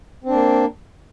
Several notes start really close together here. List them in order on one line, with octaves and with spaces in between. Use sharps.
C4 D4 A#3